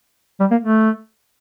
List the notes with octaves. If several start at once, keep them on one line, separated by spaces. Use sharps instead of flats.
G3
A#3
A3